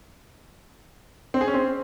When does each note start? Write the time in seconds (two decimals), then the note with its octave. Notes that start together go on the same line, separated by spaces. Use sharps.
1.34 C4
1.41 G#4
1.48 C#4
1.54 C4